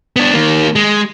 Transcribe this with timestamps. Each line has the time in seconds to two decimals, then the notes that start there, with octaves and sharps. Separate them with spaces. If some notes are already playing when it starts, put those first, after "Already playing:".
0.16 B3 D4
0.34 D#3 A#3
0.76 G#3